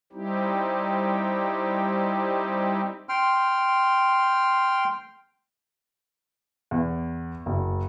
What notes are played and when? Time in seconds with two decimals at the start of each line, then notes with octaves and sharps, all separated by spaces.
0.13 G3 C4 D#4 E4 G4
3.09 G5 C6 F6
6.71 E2
7.46 F#1